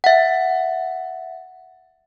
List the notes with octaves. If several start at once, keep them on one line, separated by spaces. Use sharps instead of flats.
E5 F#5